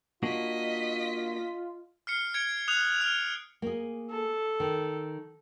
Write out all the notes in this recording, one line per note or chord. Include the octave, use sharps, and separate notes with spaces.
A#3 D4 F4 F#4 D#5 B6
F6 C7 C#7
G#6 C#7 D7
D#6 F#6 F7
F6
A#3 G#4
A4
D#3